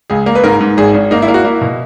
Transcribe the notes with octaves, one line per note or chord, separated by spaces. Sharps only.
C#2 G#4
A#3
B4
G#2 A#4
G#2
G#1 G#4
G#1
A#3 D#4
E4
A#3
F#4
A#3 E4
B2